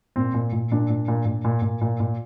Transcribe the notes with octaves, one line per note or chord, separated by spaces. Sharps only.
A#2 C4
A#2
A#2
A#2 D4
A#2
A#2
A#2
A#2
A#2
A#2
A#2